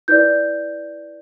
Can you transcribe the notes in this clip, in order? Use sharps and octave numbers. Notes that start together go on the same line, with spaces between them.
E4 B4 D5 G6